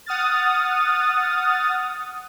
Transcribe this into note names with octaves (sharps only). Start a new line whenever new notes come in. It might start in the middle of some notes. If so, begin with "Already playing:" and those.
F#5 D#6 F6 A6